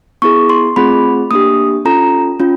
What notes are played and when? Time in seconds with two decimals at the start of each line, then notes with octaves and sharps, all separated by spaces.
0.22 B3 E4 G#4 C#6
0.49 C6
0.76 A3 C4 F4 G#4 B5
1.31 A#3 D4 G4 D#6
1.85 C#4 F4 A4 A#5
2.40 C#4 F4